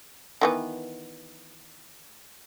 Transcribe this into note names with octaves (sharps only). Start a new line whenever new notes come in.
D#3 E3 B3